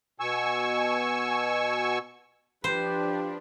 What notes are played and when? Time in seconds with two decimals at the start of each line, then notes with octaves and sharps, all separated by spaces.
0.20 B2 G#5 C#6 E6
2.64 F3 D4 G4 B4 C5